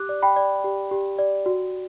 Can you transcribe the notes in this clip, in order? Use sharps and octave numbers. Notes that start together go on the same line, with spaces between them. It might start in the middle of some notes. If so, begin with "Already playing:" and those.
Already playing: G4 D6 F#6
D5
G5 B5
D5
G4
G4
D5
F#4